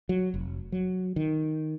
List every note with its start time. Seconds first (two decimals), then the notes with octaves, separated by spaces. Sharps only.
0.09 F#3
0.34 F1
0.72 F#3
1.16 D#3